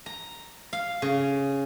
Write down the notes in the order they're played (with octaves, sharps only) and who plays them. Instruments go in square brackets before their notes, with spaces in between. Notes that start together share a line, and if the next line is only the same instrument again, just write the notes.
[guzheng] A#5
F5
C#3